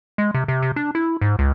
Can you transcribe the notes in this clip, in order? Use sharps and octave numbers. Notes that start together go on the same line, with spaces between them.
G#3
C3
C3
C3
D4
E4
G#2
C#2